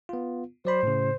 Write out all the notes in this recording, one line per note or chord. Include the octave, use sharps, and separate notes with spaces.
B3 F4
F#3 C5 D5 B5
A2 C#3